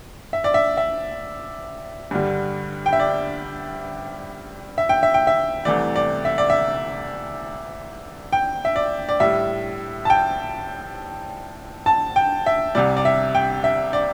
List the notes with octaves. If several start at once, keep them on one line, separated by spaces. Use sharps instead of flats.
E5
D5
E5
E5
G2 D3 G3
G5
E5
D5
E5
G5
E5
G5
E5
C2 C3 E3 A3 D5
D5
E5
D5
E5
G5
E5
D5
D5
A2 G3 E5
A5
G5
A5
G5
E5
C2 C3 G3 D5
D5
E5
G5
E5
D5